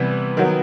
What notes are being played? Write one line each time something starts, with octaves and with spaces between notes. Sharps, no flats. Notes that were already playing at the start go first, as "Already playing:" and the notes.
Already playing: C3 E3 G3 B3
D#3 F#3 B3